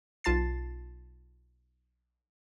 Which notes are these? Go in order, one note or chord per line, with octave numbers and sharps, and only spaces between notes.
B1 F4 A5 A6 C7